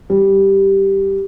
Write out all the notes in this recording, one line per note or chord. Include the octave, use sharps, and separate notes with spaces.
G3